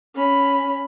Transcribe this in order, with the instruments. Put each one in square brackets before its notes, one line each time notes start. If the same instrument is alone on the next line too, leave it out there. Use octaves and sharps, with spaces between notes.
[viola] C#4 B5